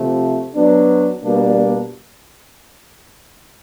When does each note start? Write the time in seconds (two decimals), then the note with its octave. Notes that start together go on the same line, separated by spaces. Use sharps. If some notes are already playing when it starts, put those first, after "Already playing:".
Already playing: C3 F3 A3
0.55 F#3 B3 D4
1.23 B2 G3 A#3 D4